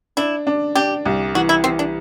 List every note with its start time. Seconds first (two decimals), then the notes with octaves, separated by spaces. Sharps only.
0.17 D4 E4
0.47 D4
0.75 D4 G4
1.06 C2
1.35 E3 F#4
1.49 E4
1.64 E3 C4
1.79 D4